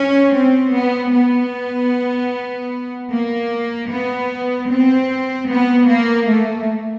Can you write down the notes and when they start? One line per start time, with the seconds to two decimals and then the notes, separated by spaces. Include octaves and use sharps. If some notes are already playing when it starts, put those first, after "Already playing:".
Already playing: C#4
0.34 C4
0.73 B3
1.13 B3
3.12 A#3
3.91 B3
4.71 C4
5.51 B3
5.90 A#3
6.30 A3